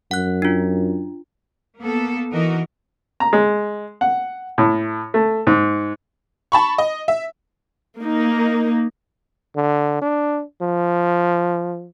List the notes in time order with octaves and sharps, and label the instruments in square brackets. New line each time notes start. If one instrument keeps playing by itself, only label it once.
[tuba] F#2 [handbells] F#5 F#6
[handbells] D4 F4
[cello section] A#3 B3 A4
E3 D#4 F#4 A#4 D#5
[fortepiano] A#5
G#3
F#5
A2
A3
G#2
[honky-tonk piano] A5 B5 C#6
D#5
E5
[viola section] A#3 D#4
[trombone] D3
D4
F3